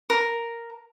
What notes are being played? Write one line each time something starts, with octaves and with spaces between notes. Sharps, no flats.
A#4